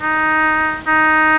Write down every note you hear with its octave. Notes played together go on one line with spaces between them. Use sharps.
D#4
D#4